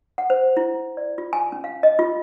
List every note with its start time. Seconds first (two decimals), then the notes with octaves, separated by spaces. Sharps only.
0.18 F#5
0.30 C5
0.57 E4
0.97 D5
1.18 F4
1.33 G#5
1.52 C#4
1.64 F5
1.83 D#5
1.99 F4